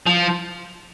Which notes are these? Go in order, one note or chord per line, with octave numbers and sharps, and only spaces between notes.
F3